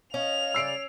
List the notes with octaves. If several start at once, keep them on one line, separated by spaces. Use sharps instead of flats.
C#4 D#5 F5 F7
C#3 D5 E6 C7 D7